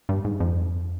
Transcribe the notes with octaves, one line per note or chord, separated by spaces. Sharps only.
G2
G#2
F2